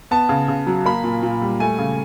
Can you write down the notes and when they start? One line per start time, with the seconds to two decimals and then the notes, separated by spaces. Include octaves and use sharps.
0.11 B3 A5
0.29 C#3
0.48 C#3
0.67 F#3
0.86 A#3 B5
1.04 A#2
1.23 A#2
1.42 G3
1.60 A3 G#5
1.78 C#3